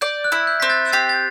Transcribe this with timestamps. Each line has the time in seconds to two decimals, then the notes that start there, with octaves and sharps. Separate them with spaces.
0.01 D5 G6
0.24 F#6
0.32 E4
0.47 G6
0.60 C4 B6
0.70 F#6 A6
0.92 G4 A6 C7
1.09 A6